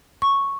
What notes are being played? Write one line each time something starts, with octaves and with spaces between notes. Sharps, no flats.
C#6